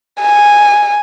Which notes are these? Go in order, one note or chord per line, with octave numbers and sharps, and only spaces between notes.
G#5